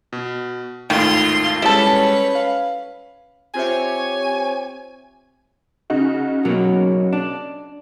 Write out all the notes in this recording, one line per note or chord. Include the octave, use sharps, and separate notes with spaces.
B2
G#1 D#2 A2 D#3 F4 C6
G3 G#3 C#4 E4 A4 B4
F5
C4 F4 G4 C5 C#5 E5 G#5
C#3 D#4 F#4
B2 F#3 A#3
D4